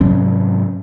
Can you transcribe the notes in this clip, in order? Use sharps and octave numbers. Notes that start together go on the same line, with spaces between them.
G#2 C3 F#3 C#4